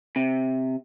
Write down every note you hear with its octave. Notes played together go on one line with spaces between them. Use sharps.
C3